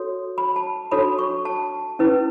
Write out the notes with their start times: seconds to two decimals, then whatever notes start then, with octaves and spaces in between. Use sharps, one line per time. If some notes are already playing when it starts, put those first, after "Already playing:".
Already playing: F#4 A4 C#5
0.38 B5
0.56 A5
0.91 D4 F#4 A4 C#5 B5
1.19 C#6
1.45 A5
1.99 C#4 E4 B4